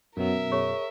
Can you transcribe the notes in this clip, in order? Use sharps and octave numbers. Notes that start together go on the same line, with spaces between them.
F#2 B2 F#3 A#4 E5
G#4 C#5 C#6